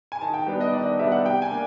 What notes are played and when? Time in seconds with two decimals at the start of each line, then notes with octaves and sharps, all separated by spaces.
0.12 G#5
0.21 D#3 A5
0.34 G5
0.47 G3 B3 D4
0.60 D#5
0.73 D#3 D5
0.86 D#5
0.99 G3 B3 D4 E5
1.12 F#5
1.25 C3 G5
1.42 G#5
1.50 A#3 D4